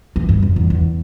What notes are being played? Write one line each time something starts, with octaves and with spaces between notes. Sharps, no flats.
E3
G2
F2
E2
E2